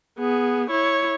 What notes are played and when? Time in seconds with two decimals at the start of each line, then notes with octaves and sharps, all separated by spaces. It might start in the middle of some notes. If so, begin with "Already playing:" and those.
0.19 B3 G#4
0.70 E4 C#5